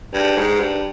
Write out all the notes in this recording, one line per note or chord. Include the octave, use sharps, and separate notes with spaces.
G2
G#2
G2